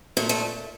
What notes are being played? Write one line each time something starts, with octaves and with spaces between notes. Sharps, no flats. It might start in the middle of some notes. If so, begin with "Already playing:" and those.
A#2 A3
A3